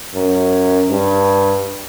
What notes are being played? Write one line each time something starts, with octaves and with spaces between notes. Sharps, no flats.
F#2
G2